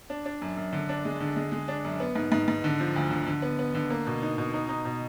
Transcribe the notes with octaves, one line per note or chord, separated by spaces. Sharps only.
D4
D4
F#2
F#2
D3
D4
G#3
D3
G#3
G#3
D4
F#2
B3
G#2
G#2
G#2
D3
F3
D2
D3
D3
B3
B3
D3
A#3
B2
D#4
B2
D#4
D#4
B2